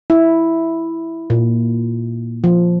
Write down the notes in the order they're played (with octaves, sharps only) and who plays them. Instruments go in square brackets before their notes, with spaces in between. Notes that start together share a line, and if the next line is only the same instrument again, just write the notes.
[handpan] E4
A#2
F3